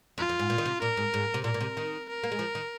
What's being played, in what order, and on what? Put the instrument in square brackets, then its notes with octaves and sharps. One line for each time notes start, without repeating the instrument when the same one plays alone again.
[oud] F2 [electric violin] F4
[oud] F2
G#2
A#2
D#3
C3
[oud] A#2 [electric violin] A#4
[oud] G#2
G#2
C3
[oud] A#2 [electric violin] A#4
[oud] A#2
C3
D#3
[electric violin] A#4
[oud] A#3
G#3
F3
D#3